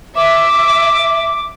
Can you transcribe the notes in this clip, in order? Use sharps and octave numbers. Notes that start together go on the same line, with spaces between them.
E5 D6